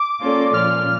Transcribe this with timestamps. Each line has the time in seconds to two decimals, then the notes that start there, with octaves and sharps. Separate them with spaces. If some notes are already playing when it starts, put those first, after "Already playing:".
Already playing: D6
0.20 A#3 C#4 F4 A4 D5
0.53 A#2 F3 C#4 F4 F6